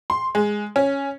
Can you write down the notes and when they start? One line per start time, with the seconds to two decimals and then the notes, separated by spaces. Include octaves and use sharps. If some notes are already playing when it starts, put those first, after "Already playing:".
0.10 C6
0.35 G#3
0.76 C#4